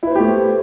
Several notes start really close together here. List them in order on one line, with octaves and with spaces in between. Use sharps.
E4 B4 C5 G4 A3